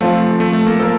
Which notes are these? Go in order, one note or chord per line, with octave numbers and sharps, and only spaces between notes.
F3 A3 C4 F4
A3
A3
A#3
F3 A#3 F4 A4 A#4